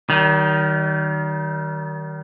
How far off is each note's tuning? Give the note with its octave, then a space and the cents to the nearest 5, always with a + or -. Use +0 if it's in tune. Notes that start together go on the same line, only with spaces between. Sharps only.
D#3 +0 G3 -45